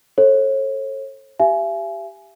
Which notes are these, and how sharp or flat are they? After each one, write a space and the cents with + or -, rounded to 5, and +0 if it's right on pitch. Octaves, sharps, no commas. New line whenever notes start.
A4 +0 C#5 -40
G4 +0 E5 +40 G#5 +20